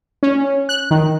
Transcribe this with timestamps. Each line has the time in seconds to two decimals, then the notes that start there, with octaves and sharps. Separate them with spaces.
0.23 C#4
0.69 F#6
0.91 D#3